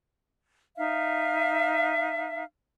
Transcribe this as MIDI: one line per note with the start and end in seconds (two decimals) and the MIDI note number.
0.77 2.44 63
0.77 2.44 76
0.77 2.44 77